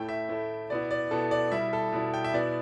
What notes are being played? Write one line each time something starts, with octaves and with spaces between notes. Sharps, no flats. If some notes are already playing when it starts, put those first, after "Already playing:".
Already playing: A2 A3 E4 G5
E5
A2 A3 E4
B2 B3 E4 D5
D5
B2 B3 E4 A4
D5
B2 G3 E4 E5
A4
B2 G3 E4
G5
E5
B2 B3 E4 D5